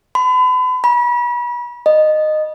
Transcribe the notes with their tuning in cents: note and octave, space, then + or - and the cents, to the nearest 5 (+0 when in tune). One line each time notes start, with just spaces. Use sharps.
B5 +40
B5 -35
D#5 -15